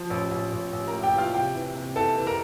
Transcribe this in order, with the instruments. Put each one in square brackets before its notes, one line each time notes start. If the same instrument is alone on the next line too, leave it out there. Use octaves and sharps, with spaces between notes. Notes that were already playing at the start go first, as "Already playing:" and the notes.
Already playing: [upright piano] F3
A1
A1
A1
A1
A#4 A#5
A2
G4 G5
E3 F4 F5
C3 G4 G5
E3
C3
E3 A4 A5
E3
A#4 A#5